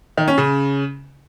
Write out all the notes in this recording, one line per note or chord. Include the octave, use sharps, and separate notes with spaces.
D#3
C#4
C#3